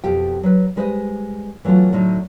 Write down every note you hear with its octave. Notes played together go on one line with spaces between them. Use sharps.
F2 B2 G4 G5
F#3 B4
G3 G#3 B4 C5 D5 D#5
E3 F#3 A3 B3 F4
A2 D3 F#3 D#4 E4